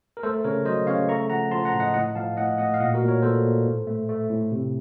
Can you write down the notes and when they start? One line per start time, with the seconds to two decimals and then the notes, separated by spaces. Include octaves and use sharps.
0.17 A#4
0.23 A3 A4 C5
0.44 C#3 A#4 C#5
0.65 F#3 C5 D#5
0.87 C#3 C#5 F5
1.09 A3 A#5 C#6
1.30 F3 F#5 A#5
1.51 F3 A5 C6
1.65 F#5 A#5
1.73 A2
1.80 D#5 F#5
1.94 A2 D#5 F#5
2.15 F3 F5 A5
2.37 A2 D#5 F#5
2.58 A3 D#5 F#5
2.74 F5
2.80 A#2 D#5 F#5
2.94 F#4 A#4
3.02 A#2
3.08 A#4 C#5
3.22 A#2 A4 C5
3.44 A#2
3.66 A2
3.87 A3
4.09 A3
4.29 A2
4.52 C3